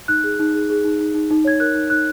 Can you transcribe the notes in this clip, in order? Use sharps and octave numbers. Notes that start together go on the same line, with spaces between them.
D#4 F#6
G#4
D#4
G#4
G#4
D#4
D#4
D#4
D#4
C#5 G#6
A#4 F#6
D#4
D#4 F#6